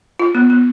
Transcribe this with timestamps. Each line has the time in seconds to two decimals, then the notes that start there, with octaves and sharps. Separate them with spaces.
0.20 F4
0.35 B3
0.50 B3